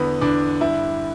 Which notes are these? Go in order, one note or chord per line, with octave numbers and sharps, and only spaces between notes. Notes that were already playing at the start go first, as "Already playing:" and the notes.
Already playing: E2 D3 B3
E2 D3 D4
G2 D3 E4